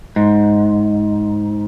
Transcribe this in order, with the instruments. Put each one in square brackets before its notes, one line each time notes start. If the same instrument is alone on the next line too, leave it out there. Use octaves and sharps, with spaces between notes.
[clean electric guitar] G#2